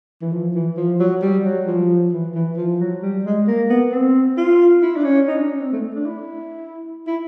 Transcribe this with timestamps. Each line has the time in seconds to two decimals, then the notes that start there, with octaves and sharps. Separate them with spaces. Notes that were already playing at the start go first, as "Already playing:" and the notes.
0.21 E3
0.32 F3
0.55 E3
0.77 F3
1.00 F#3
1.22 G3
1.44 F#3
1.67 F3
2.12 E3
2.34 E3
2.57 F3
2.80 F#3
3.02 G3
3.25 G#3
3.47 A#3
3.70 B3
3.92 C4
4.37 F4
4.82 E4
4.96 D4
5.04 C#4
5.27 D#4
5.38 D4
5.49 C#4
5.60 C4
5.72 A3
5.95 D4
6.06 E4
7.07 E4